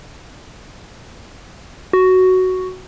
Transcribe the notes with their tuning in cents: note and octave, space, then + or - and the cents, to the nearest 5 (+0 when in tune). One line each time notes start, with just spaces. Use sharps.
F#4 +5